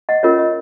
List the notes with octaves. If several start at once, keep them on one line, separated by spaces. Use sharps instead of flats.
D#5 F#5
C#4 F4 A#4 C#5 D#5
D#5